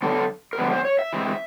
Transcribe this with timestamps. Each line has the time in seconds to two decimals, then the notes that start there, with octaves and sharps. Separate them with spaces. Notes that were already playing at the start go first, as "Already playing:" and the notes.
0.02 D3 F#3 B3 A4
0.53 A#4
0.58 D3 F3 G#3 B3 B4
0.72 C5
0.85 C#5
0.99 E5
1.13 E3 G#3 C4